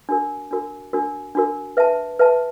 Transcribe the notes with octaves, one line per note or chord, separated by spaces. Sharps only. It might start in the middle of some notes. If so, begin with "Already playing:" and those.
D4 F#4 A#4
D4 F#4 A#4
D4 F#4 A#4
D4 F#4 A#4
B4 E5 A5
B4 E5 A5